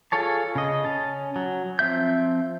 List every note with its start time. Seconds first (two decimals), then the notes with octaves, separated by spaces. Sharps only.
0.12 F4 G#4 A4 C#5 A5
0.55 C#3 D#5
0.85 C#4 A5
1.36 F#3
1.79 F3 C4 E5 G6